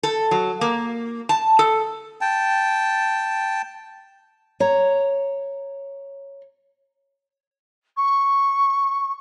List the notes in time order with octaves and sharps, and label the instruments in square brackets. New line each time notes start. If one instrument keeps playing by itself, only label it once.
[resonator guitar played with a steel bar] A4
F#3
A#3
A5
A4
[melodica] G5 A5
[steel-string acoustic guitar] C#5 A#5
[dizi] C#6